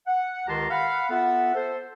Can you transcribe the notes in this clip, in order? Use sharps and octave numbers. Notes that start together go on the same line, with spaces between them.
F#5
C#2 D#3 G4 A5 A#5 C6
F5 F#5 B5
B3 F4 A4 E5 F#5
A4 C5